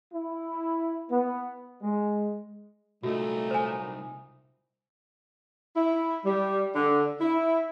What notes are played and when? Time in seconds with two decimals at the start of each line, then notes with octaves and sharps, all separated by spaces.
0.13 E4
1.09 B3
1.82 G#3
3.03 C2 A#2 F#3 A3 D#4 F#4
3.51 C5 G#5
5.76 E4
6.25 G3
6.74 D3
7.20 E4